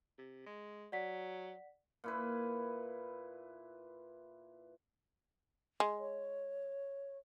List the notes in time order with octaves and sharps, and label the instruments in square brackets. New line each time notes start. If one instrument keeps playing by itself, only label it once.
[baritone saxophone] C3
G#3
[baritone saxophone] F#3 [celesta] D5 F#5 B6
[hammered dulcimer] A#2 E4 B4
[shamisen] G#3
[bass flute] C#5